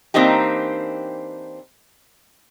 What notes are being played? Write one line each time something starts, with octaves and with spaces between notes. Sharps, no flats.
E3 A#3 C4 D4 D#4 G4